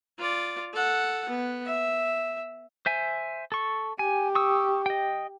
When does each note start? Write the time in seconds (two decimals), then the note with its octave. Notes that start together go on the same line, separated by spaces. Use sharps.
0.18 F4 D5
0.73 A4 F#5
1.29 B3
1.65 E5
2.86 C5 E5 G#5
3.52 A4 C#6
3.99 G4 G#5
4.35 C#6 D#6 E6
4.86 D#5 G5